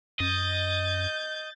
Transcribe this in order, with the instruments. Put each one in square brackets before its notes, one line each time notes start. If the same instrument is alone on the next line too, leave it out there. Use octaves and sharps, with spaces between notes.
[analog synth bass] F#2 [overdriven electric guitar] D#5 [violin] G6 A6